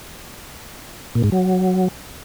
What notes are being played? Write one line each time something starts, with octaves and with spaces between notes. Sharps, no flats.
A#2
G#2
F#3